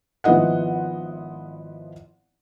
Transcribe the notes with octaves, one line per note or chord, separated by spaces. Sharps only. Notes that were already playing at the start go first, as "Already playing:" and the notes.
G#1 F3 B3 E4 D#5 F#5